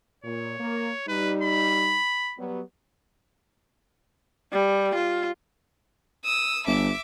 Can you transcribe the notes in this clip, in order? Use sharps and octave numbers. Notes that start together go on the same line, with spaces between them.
A#2 C#5
A#3
G3 D#4 B4
B5
F#3 G3 B3
G3
F4
D#6 E6
G1 E5 D6